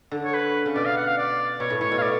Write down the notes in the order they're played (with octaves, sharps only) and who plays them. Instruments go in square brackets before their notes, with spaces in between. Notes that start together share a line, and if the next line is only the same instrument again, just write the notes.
[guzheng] D3
[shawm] C#5
B4
[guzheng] C#3
[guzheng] B2 [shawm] D5
[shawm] F5
F#5
F5
D5
[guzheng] B2 [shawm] C#5
[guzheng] A2
[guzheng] A2 [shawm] C#5
[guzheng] B2
[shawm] F5
D5